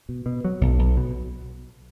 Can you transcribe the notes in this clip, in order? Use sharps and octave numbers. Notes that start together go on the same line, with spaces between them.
B2
B2
F#3
B1
B1
B2